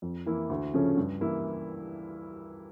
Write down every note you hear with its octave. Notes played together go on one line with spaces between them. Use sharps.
F2
E3 A#3 E4
D2
C#3 F3 A3 C#4
G2
E3 A#3 E4